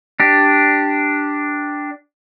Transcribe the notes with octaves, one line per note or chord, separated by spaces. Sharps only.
D4 G4